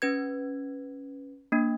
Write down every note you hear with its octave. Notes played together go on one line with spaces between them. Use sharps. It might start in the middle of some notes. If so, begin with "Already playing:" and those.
C#4 B4 G#6
A#3 D4